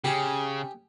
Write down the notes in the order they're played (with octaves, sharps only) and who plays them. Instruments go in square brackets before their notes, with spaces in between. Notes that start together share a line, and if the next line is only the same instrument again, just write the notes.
[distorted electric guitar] C#3 [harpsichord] G4 G#4